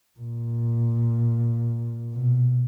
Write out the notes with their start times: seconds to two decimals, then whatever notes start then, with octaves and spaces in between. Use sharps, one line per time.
0.20 A#2
2.13 B2